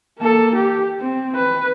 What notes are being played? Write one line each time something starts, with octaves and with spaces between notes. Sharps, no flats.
A#3 A4
G4
C4
B4